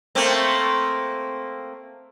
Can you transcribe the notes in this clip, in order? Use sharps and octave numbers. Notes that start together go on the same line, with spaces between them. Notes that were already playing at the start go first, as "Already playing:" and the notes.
A3 A#3 C4